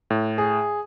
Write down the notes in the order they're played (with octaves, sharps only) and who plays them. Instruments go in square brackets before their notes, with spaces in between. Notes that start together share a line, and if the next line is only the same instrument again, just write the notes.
[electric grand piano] A2
[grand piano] G#4